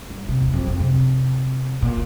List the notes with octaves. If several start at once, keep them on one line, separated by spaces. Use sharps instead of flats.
G2
C3
E2
F2
C#3
C3
A#2